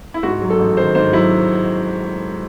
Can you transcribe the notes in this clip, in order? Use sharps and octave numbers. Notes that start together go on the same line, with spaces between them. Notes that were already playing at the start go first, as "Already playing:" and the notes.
E4
G#2 F#4
F#3
A4
A1
D#3 C5
G#2 C5
F#3 E4